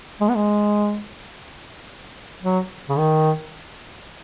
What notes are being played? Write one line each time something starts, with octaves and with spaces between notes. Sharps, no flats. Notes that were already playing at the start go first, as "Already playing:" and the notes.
G#3
B3
G#3
F#3
C#3
D#3